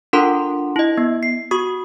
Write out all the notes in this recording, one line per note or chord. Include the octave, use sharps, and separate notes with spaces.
D4 F4 A4 A#4 F#5 C6
E4 D#5
B3
C7
F#4 C#6 D#6